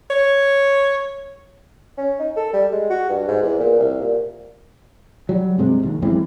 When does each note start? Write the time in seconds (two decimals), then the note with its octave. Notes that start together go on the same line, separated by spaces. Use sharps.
0.11 C#5
1.97 C#4
2.19 D#4
2.36 A4
2.53 G3
2.72 G#3
2.90 F#4
3.09 G2
3.28 G#2
3.43 E2
3.59 A#2
3.79 C2
4.01 A#2
5.29 F#3 G3
5.58 G2 C3 G#3 C4
5.83 A#1 D#2
6.02 F#2 E3 G#3 C4